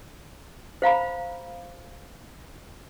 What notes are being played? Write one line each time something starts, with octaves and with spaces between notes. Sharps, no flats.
C5 F5 A#5 B5